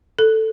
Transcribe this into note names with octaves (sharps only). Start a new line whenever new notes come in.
A4